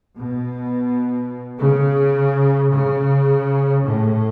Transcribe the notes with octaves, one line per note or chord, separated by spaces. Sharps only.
B2
C#3
C#3
A2